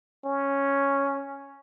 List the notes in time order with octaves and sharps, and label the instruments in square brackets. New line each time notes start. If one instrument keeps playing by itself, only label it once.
[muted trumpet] C#4